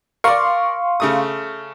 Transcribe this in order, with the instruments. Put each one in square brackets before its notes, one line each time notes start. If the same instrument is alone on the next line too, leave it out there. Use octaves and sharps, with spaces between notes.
[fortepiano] A#4 D5 [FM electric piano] F5 C6 C#6
[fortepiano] C#3 A3 D#6